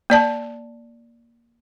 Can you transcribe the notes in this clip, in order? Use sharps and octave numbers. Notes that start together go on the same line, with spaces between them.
A#3 D5 A5